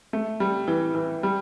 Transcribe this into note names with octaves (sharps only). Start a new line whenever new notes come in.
A3
G3
E3
E3
G3